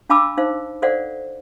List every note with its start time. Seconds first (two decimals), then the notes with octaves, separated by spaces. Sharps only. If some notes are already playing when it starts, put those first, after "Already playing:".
0.10 D4 F5 A5 B5 D6 E6
0.37 D#4 C5 F5
0.82 A4 C5 D5 F5 F#5